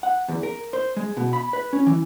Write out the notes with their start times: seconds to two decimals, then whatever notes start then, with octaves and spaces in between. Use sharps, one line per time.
0.03 F#5
0.28 E2
0.43 A#4
0.73 C5
0.97 G#3
1.17 B2
1.33 B5
1.53 B4
1.73 C#4
1.87 E3